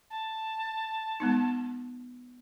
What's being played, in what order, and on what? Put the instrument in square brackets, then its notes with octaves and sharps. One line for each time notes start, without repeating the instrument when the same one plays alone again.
[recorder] A5
[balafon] G#3 B3 D#4